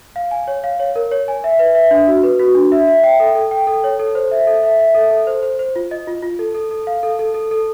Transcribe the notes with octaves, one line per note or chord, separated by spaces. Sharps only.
F5
G#5
C#5
F5
C#5
A#4
C#5
G#5
E5
B4
E5
D4
F#4
B4
F#4
D4
E5
E5
G5
A4
A4
G5
A4
C#5
A4
C5
E5
A4
E5
E5
A4
A4
C5
C5
C5
F4
D#5
F4
F4
A4
A4
A4
F5
A4
A4
A4
A4